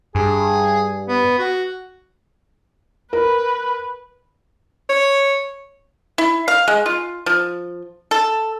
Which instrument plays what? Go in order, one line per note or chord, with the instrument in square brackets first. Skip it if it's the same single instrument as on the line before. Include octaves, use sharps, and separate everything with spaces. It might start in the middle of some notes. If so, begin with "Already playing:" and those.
[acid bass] G2 [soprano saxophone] G#4
[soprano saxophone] B3
F#4
[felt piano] A#4 [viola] B4
[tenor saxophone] C#5
[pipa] E4
F5
G#3
F4
F3
A4